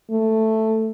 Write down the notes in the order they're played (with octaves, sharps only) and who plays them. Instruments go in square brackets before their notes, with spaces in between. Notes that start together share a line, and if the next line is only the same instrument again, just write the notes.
[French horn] A3